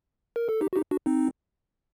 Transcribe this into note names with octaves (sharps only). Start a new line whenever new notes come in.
A#4
A4
D#4 G4
F#4
D#4 G4
D4 F#4
C4 D#4